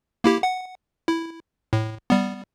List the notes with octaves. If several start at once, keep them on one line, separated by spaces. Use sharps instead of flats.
A#3 E4 G4
F#5
E4
A2
G3 B3